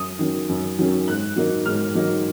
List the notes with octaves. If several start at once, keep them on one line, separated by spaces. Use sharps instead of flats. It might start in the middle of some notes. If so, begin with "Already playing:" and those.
Already playing: F#2 D#6
D#3 F#3 C#4
F#2
D#3 F#3 C#4
G#2 F#6
F#3 A#3 D#4
G#2 F6
F#3 A#3 D#4